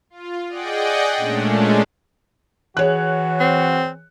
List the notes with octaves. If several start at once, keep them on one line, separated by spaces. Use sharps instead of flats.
F4
G#4 D5 D#5 F#5 G5
A#2 G#3 A3 C#4 D4
E3 F#4 G#4 C#5 F#6
C4